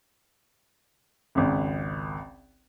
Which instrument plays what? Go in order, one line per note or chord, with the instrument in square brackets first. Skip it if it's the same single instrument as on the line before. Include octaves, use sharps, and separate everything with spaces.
[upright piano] G#1 C#2